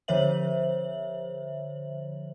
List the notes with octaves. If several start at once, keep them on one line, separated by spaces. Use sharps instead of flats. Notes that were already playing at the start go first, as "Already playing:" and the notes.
D3 F3 C5 C#5 E5 F#7